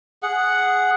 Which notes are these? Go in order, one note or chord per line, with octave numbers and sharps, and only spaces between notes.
G#4 F#5